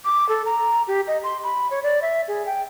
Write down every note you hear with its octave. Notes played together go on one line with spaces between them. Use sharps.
D6
A4
A#5
G4
D#5
C6
B5
C#5
D5
E5
G#4
G5